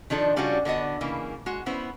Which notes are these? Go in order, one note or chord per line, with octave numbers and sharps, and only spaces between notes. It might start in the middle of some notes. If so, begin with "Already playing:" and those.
D#3 F3 D4 A4
C#3 G3 C#4 D4 F4 F#4
D3 B3 F#4 D#5
C#3 E3 A#3
G#3 F#4
B3 C#4 E4 C5